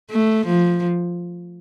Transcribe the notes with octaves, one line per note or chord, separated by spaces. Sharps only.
A3
F3